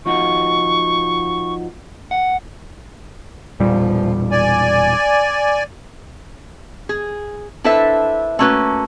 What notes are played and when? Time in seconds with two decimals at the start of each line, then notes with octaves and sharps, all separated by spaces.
0.06 F3 D#4 F#4 C#6
2.11 F#5
3.60 E1 A#2 F3 G3
4.31 D5 G#5
6.89 G#4
7.64 D4 E4 A4 B4 C5 E5
8.39 A3 A#3 C#4 F#4 B4